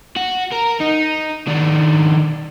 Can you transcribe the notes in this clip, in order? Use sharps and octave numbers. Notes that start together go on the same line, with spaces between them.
F#4
A#4
D#4
D#3 D4